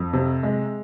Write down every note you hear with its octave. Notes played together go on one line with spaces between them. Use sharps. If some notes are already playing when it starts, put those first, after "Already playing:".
Already playing: F2
C3
G#3